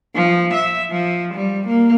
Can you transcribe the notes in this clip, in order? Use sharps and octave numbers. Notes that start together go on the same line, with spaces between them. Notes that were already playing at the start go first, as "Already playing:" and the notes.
F3
E5
F3
G3
A#3